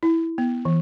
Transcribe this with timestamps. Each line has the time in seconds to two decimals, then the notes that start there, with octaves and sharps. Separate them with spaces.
0.03 E4
0.38 B3
0.65 E3